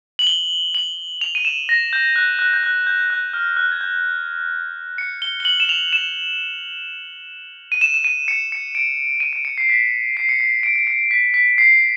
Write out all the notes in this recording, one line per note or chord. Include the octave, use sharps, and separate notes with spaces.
F#7
G7
F#7
F7
D#7
E7
A#6
G6
F#6
F#6
G6
F#6
G6
F#6
F6
F#6
G#6
G6
C#7
G7
G7
F#7
E7
F7
E7
D#7
E7
E7
D#7
C#7
C#7
D7
D#7
D7
C#7
C7
B6
C7
C#7
C7
D7
D7
C#7
B6
B6
C7